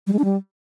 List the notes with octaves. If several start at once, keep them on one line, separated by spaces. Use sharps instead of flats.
G3
G#3
D4
G3